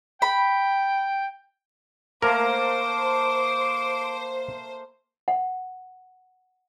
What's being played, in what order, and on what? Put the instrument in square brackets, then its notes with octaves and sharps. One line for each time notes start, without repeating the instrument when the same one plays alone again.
[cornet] G5 [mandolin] B5
[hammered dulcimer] A3 A#3 [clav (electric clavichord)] A#4 [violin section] C5 [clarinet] D6
[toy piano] F#5